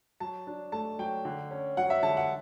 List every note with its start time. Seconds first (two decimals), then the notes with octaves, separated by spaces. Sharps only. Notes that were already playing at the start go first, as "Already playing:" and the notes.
0.20 F#3 A5
0.47 D4
0.72 A3 A5
0.99 F#3 G5
1.25 D3
1.51 C#4
1.77 F#3 F#5
1.90 E5
2.03 D3 A5
2.17 F#5